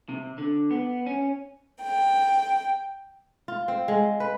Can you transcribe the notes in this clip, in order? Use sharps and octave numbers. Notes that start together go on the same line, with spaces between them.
C3
D3
B3
C#4
G5
F4
C4
G#3
B4